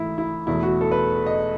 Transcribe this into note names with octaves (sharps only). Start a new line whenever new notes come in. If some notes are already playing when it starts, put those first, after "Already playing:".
Already playing: G#2 E3 A3 E4
E4
E2 B2 A3 E4
F#4
A4
B4
D#5